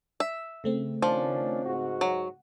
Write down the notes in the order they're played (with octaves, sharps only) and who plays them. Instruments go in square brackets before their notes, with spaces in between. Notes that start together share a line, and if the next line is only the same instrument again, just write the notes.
[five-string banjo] E5
[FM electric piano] C#3 A3 C4
[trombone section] D#3 C#4 D4 [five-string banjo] F3
[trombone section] G#2 F#4
[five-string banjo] F#3